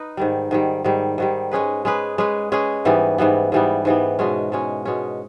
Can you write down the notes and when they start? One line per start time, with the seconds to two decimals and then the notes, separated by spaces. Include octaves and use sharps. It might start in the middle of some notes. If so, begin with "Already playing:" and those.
Already playing: D#4 B4
0.17 G#2 D#3 G3
0.51 G#2 D#3 G3
0.84 G#2 D#3 G3
1.18 G#2 D#3 G3
1.51 G#3 C#4 G#4 B4
1.85 G#3 C#4 G#4 B4
2.18 G#3 C#4 G#4 B4
2.52 G#3 C#4 G#4 B4
2.85 G#2 E3 G3 B3
3.18 G#2 E3 G3 B3
3.52 G#2 E3 G3 B3
3.85 G#2 E3 G3 B3
4.19 B2 G#3 C#4
4.52 B2 G#3 C#4
4.85 B2 G#3 C#4